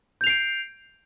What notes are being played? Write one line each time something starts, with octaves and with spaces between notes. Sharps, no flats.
G6 C7 D7 F7